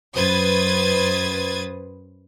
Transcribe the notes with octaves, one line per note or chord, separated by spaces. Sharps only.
F#2 B4 C5 D#6 G#6 A6